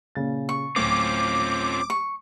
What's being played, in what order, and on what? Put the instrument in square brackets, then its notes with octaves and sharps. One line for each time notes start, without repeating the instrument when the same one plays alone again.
[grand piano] A#2 C#3 A6
[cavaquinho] C#6
[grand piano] D1 A2 C5 [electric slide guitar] C4 C#4 F4 [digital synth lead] D6
[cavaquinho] C#6